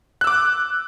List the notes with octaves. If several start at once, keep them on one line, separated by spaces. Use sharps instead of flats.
D6 E6 F#6